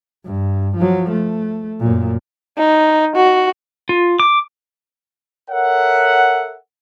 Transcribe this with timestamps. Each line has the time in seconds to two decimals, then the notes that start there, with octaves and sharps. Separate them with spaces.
0.25 G2
0.77 F3 F#3
1.11 A3
1.80 F#2 A#2
2.58 D#4
3.15 F#4
3.89 F4
4.20 D6
5.50 A4 A#4 C#5 E5 F#5